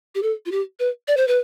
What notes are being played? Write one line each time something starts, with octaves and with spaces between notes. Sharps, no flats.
G4
A4
F4
G4
B4
D5
C5
B4